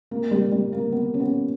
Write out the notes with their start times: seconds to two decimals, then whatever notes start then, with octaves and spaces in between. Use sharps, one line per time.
0.11 A#3
0.31 G3
0.52 G3
0.73 A#3
0.92 B3
1.14 C#4
1.20 B3